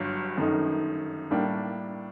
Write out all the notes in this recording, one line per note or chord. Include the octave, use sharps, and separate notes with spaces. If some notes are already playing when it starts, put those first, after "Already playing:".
Already playing: G1 G2 F#3
G1 F#2 D#3 A3 D#4
A2 G3 A#3 D4